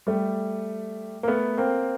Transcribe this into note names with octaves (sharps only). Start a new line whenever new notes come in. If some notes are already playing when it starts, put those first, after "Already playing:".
G3 A3
A#3
A3 B3
A#3 C4